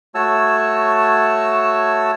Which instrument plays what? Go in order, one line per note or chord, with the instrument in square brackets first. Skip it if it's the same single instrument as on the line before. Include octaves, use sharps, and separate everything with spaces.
[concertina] A3 F#4 C#5 A5 E6